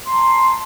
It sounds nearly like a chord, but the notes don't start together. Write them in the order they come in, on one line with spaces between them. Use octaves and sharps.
C6 A#5 A5